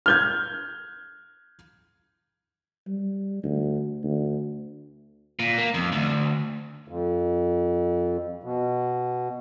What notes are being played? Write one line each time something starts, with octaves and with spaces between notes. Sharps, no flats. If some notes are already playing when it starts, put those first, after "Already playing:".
F6 G6 G#6
G3
D2
D2
A#2
A#3
F2
D2
F2
B2